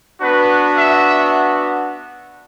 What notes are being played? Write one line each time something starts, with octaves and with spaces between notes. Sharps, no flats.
B3 D4 F#4 B4
E5